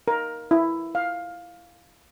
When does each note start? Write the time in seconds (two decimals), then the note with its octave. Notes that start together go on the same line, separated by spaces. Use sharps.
0.08 A#4
0.51 E4
0.95 F5